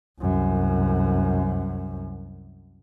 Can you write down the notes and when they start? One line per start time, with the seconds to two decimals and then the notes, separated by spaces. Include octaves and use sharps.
0.21 C2 F#2